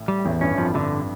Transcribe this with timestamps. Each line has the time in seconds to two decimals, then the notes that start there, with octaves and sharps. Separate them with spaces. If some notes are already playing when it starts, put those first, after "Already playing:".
Already playing: A1 A2
0.08 G3
0.25 A1 E2 A2
0.41 G2 C#4
0.58 F2 F3
0.74 G2 D3